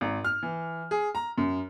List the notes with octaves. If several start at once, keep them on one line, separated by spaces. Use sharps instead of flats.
G#1
F6
E3
G#4
A#5
F#2